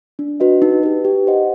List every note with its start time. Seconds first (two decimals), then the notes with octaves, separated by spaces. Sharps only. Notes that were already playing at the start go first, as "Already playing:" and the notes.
0.19 D4
0.40 F#4 B4 D#5
0.62 D#4
0.83 G4 B4
1.05 G4
1.27 C5 D#5 F#5